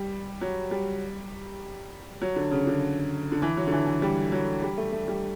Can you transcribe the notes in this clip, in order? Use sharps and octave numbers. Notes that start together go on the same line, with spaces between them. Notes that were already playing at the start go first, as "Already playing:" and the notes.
Already playing: G3
F#3
G3
F#3
D3
C#3
D3
D3
E3
F#3
D3
E3
E3
G3
F#3
G3
A3
A3
G3